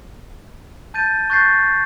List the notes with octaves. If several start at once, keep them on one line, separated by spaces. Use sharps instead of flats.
A5 G6 A6 D#7
C#6 F#6 G6 A6 A#6 C7